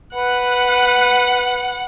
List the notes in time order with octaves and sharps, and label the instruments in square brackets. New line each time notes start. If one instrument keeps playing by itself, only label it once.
[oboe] B4 [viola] F#5